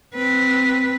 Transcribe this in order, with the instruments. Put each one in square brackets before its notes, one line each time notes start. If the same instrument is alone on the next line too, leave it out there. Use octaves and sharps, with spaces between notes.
[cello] C4 B4